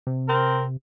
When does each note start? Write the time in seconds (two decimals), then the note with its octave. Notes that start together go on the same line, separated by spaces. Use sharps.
0.07 C3
0.28 C4 A#4